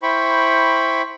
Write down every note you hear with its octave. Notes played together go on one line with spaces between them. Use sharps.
E4 C5 G5 B5 C#6